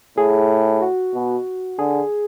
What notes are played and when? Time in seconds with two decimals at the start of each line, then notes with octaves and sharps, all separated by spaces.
0.18 A2 G#4
0.82 F#4
1.14 B2
1.79 D3 G#4